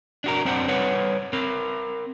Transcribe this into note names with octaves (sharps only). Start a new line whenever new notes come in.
D4 F#4 A#4
F#2 C4 D4 C5 F#5
G3 B4 C#5 F#5
C4 A#4